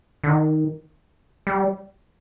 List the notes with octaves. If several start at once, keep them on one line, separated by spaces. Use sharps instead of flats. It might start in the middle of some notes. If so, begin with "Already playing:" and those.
D3
D#3
G3